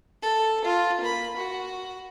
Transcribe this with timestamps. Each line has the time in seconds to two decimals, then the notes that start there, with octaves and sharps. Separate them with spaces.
0.22 A4
0.64 F4
1.01 A#3 B5
1.36 F#4